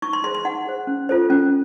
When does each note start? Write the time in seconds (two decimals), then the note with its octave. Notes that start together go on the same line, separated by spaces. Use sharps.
0.02 D#4 C#6
0.13 C6
0.24 G#4 C5 C6
0.35 C6
0.45 D#4 F#5
0.67 G#4 C5
0.87 C#4
1.09 F4 A4 C5
1.30 C#4